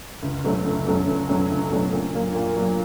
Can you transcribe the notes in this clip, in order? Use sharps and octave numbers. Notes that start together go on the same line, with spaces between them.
C#2
B2 F#3 A3 C#4
C#2
B2 F#3 A3 C#4
C#2
B2 F#3 A3 C#4
C#2
B2 F#3 A3 C#4
A#2
F#3 A#3
A#2
F#3 A#3